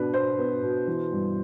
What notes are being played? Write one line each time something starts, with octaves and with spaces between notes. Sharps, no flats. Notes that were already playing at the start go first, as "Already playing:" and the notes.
Already playing: B2 B3 D4 B4
B2 C5
B3
B2
E3
G2